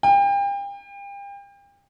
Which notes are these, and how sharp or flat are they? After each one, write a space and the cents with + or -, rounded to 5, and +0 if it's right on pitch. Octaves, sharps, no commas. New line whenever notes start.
G5 +35